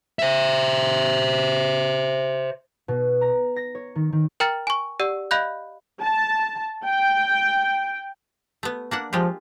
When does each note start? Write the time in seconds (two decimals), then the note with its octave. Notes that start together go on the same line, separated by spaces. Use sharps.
0.19 C5 E5
2.88 B2
3.21 A#5
3.56 A#6
3.75 C#5
3.95 D#3
4.13 D#3
4.40 A#4 G5 A#5 F6 A6
4.67 G#5 C#6
5.00 G4 D5 F#5 E6
5.31 D#5 F5 B5 F#6 G6
6.02 A5
6.85 G5
8.63 A3 B3
8.91 A#3 D4 F#5
9.13 F3 G#3 F4 G4